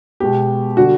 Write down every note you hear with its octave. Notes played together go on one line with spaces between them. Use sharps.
B2 G#3 B3 G4
D3 G3 F#4